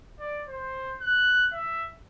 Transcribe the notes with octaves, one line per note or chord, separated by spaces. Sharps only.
D5
C5
F#6
E5